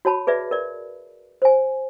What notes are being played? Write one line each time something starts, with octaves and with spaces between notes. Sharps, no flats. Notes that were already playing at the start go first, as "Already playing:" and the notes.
F#4 C#5 A5 B5
G#4 B4 D5 E5
A#4 D5
C5 G#5